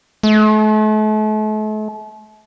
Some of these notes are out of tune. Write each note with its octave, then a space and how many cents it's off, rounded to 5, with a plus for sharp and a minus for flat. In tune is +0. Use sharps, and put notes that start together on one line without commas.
A3 -40